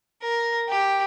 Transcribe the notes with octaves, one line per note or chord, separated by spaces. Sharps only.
A#4
G4